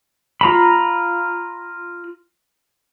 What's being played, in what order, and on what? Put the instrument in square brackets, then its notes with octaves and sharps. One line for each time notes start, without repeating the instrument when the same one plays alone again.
[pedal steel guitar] F4 A#5 B5